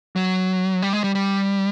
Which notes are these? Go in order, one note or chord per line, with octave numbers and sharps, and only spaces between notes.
F#3
G3
G#3
G3
G3